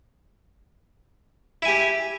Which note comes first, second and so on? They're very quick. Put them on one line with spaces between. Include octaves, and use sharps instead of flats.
E4 G#5 G4